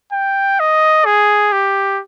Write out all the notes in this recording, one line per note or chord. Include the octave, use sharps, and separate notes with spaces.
G5
D#5
G#4
G4